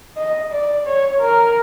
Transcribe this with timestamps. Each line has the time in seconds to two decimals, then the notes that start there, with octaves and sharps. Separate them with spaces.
0.18 D#5
0.52 D5
0.86 C#5
1.20 A#4